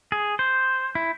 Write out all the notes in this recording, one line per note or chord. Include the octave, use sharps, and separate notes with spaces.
G#4
C5
E4